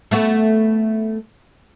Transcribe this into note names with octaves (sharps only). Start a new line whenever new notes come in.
A3 B3 F#4